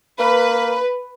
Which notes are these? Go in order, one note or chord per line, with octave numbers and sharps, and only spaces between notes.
A#3 B4